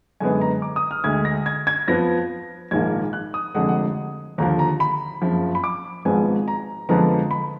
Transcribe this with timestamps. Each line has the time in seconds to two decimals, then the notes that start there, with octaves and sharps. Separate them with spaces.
0.20 F#2 D3 G#3 B3 G#5
0.41 A#5
0.62 D6
0.76 D#6
0.91 F6
1.04 D2 D3 G#3 G#6
1.25 A#6
1.46 G#6
1.67 G#6
1.88 F2 F3 B3 A#6
2.71 A#1 G#2 D#3 A#3 G#6
3.13 F#6
3.34 D#6
3.55 F1 F2 D3 G#3 F#5
3.69 F#5
4.38 D#2 D3 F3 A#5
4.59 A#5
4.80 B5
5.22 F#1 F2 F3
5.55 B5
5.64 D6
6.05 G#1 G#2 F3 G#3 B3 G#5
6.48 A#5
6.89 F2 D3 F3 G#3 B3 A#5
7.31 B5